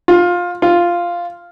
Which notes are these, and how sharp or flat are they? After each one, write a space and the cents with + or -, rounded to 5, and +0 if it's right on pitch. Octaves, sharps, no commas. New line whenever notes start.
F4 +15
F4 -5